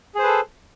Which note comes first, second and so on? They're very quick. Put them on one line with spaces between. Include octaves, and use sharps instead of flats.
G#4 C5 B4 A4